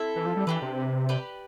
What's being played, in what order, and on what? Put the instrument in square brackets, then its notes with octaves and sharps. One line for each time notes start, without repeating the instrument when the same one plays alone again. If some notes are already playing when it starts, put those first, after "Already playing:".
Already playing: [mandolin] C4 E4 A4 E5
[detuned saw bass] E3
F3
G3
[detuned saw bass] E3 [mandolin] D4 G4 B4
[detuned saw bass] C3
[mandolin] G4 B4 D5